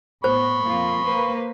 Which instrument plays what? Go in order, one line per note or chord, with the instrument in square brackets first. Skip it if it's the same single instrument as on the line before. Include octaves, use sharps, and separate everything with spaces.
[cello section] A2 B3 [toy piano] C5 [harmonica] B5 C#6
[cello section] F2 A#3 F4
A#3 B4 C5